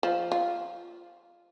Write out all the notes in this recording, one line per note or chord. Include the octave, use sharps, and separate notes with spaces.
F3
F4